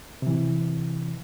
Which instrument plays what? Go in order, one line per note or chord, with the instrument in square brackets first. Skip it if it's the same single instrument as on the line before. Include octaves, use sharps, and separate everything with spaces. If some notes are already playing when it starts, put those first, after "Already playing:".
[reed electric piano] C3 E3